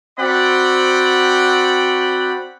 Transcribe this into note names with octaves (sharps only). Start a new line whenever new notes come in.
C4 F#4 D5 F#5 G5 B5